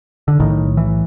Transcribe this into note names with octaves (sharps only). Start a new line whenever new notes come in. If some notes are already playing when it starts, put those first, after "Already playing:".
D3
B1 A2 D#3
E3